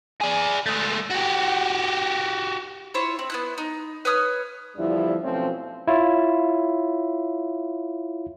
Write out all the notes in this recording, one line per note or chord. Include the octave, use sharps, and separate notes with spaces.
G#4 D5
G#3 A3
F#4 G4
E4 F4 C5 C#5
C4
B3 E4 F#6
D#4
B4 C#5 D#6 F6
E2 D3 F3 G3 D4 E4
B2 F3 F#3 A3 C4 C#4
E4 F4 C#5